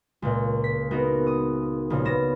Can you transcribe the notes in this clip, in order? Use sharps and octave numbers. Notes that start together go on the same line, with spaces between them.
C#2 A#2
B6
B3 D#4 F#4 A#4
D#6
A#1 C#3
B3 C#4 A#6 E7